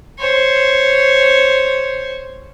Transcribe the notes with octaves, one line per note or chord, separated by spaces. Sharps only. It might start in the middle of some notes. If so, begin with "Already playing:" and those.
C5 C#5